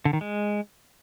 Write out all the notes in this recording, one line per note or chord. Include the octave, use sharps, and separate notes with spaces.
D3
D#3
G#3